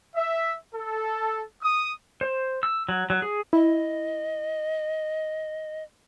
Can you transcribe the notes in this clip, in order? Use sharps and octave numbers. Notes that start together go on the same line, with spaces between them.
E5
A4
D#6
C5
E6
F#3
F#3
G#4
E4 D#5